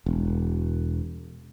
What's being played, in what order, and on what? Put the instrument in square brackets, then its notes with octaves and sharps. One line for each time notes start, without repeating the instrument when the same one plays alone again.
[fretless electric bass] E1